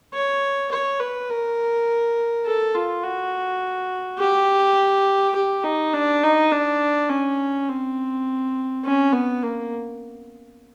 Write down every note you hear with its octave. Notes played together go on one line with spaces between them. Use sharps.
C#5
C#5
B4
A#4
A4
F4
F#4
G4
G4
D#4
D4
D#4
D4
C#4
C4
C#4
B3
A#3